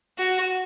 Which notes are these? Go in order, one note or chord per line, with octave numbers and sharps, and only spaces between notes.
F#4